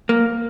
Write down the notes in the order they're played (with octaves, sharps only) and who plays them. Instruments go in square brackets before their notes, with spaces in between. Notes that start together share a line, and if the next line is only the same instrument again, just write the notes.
[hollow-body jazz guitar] A#3